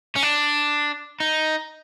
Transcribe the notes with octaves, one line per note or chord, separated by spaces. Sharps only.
C#4
D4
D#4